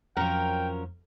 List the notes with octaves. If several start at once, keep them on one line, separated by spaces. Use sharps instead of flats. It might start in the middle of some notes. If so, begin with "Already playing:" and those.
F2 F3 F#3 C#4 A#4 G5